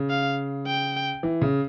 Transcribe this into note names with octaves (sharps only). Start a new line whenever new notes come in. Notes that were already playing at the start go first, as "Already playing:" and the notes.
Already playing: C#3
F5
G5
E3
C#3